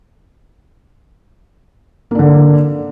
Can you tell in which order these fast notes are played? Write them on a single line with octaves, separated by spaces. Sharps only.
A#3 D4 D3